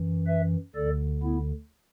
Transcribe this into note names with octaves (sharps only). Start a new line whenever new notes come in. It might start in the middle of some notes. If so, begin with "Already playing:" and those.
Already playing: F#2 E3
B4 E5
D2 D3 A4 D5
B3 E4